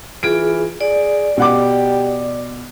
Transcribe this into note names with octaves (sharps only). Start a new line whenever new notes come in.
E3 F4 G#4 D7
G#4 D5
B2 G4 F#5 D6